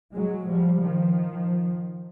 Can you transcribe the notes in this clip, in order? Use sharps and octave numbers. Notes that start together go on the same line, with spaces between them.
F#3 G#3
F3 G3
D#3 F3